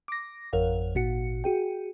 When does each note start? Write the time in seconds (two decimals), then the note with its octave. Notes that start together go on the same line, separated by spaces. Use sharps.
0.08 D6 A#6
0.53 G#1 F2 A#4 C#5 F5 F#5
0.95 G#1 A#2 F#4 F#5 C#7
1.44 F#4 G#4 G5